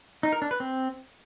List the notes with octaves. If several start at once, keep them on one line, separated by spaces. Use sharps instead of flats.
D#4
A#4
D4
B4
C4